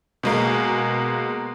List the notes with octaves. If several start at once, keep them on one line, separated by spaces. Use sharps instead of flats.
B2 G#3 A#3